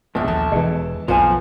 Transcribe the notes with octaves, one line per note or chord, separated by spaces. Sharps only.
A#1 F2 B2 G#4 A5
D#2 A4 A5
E1 E2 B2 E3 G#3
B1 F2 A2 F4 B4 C5 F5 G#5